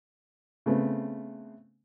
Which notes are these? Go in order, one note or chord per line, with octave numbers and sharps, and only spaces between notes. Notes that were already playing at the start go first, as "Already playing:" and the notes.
C#3 A3 B3 C4